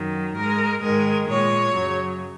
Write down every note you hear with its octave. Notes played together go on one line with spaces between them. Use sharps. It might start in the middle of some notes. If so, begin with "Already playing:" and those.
Already playing: F#2 D#3 F#3
G#2 G#3 A#4
G#2 D#3 G#3 A#4
A#2 G#3 C#5
F#2 C#3 F#3